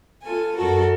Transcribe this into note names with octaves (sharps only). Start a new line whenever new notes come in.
F4 A4 G#5
F#2 F#4 A4 A#4